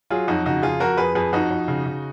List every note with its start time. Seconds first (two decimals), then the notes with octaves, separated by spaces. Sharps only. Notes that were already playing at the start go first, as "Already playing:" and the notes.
0.10 F#3 F4 G#4
0.28 F2 D#4 F#4
0.45 C#3 D#4 F#4
0.62 F2 F4 G#4
0.80 F2 F#4 A#4
0.97 F2 G#4 B4
1.15 F2 G#4 B4
1.33 F2 D#4 F#4
1.51 F2
1.68 C#3
1.85 C#3